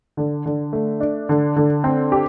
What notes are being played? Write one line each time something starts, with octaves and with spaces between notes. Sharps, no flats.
D3
D3
A3
D4
D3
D3
C4
G4